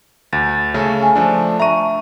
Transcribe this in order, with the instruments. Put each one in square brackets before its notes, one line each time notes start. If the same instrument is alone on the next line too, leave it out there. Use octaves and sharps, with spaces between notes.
[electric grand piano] D2 [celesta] A6
[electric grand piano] C#3 A3 C#4
[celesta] G#5
[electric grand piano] F3 A3 D4
[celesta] E5 C#6 [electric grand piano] A#5 D#7